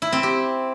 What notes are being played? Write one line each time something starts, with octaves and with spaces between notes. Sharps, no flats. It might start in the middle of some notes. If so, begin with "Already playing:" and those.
E4
C4
G4